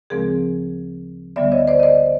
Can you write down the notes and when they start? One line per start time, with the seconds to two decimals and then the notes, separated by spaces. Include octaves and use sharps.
0.10 D2 C#3 F3 G#3 C4 G#4 A#4
1.36 D2 D3 G3 B3 D5 E5
1.52 C#5 D#5
1.68 C5 D5
1.80 D#5
1.83 C5 D5